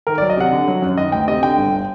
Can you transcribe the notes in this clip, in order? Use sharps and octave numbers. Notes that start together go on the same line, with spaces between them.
D#3 A#4
D5
F#3
D#5
C3 F#5
D3
F#3
F#2
D#3 D#5
D2 G5
C3 D#5
D3 G5
G1